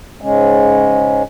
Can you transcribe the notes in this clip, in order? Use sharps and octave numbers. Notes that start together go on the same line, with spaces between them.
G#2 C#3 G#3 C#4